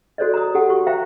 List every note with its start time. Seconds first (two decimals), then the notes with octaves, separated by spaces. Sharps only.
0.18 F#4 A4 C5 D5 D#5
0.34 A#5 D#6
0.55 G4 A4 F#5
0.69 F#4 C#6
0.87 C5 E5 F5 G5 A#5